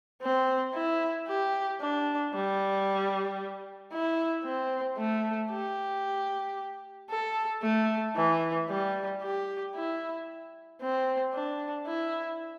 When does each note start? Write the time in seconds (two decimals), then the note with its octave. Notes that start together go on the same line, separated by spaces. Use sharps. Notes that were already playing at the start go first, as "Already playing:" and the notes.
0.22 C4
0.74 E4
1.28 G4
1.81 D4
2.34 G3
3.93 E4
4.45 C4
4.98 A3
5.51 G4
7.10 A4
7.62 A3
8.17 E3
8.69 G3
9.22 G4
9.75 E4
10.81 C4
11.34 D4
11.87 E4